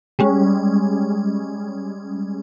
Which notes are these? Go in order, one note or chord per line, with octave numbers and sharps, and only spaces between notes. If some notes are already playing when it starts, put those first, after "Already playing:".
G3 G#3 C#4